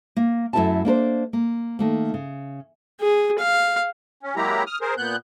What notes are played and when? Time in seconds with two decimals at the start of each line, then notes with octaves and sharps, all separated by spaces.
0.17 A#3
0.53 F#2 A3 E4 A#4 E5 A5
0.85 A#3 D4 A#4 C5
1.33 A#3
1.79 D#3 A3 A#3
2.14 C#3
3.01 G#4
3.39 F5
4.23 C#4
4.36 F#3 G#3 A#3 E4 G4 A#5
4.67 D#6 F6
4.81 G#4 A#4 C5
4.98 A#2 B3 F#6 G6